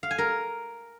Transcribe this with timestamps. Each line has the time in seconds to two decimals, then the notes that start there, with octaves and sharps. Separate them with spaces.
0.03 F5
0.11 G#5
0.18 A#4